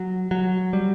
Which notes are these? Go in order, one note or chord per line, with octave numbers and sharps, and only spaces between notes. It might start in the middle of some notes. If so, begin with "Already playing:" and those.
Already playing: F#3
F#3
G3